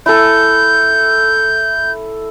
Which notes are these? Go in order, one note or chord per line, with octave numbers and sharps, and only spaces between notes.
E4 A4 G6